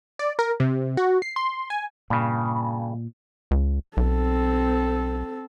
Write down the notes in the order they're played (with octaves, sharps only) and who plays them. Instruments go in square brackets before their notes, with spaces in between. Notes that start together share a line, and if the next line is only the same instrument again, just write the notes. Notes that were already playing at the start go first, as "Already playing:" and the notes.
[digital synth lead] D5
A#4
C3
F#4
C7
C6
G#5
[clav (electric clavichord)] G2 C#3 [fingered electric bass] A#2
[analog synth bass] C#2
[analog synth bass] B1 [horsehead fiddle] C4 A4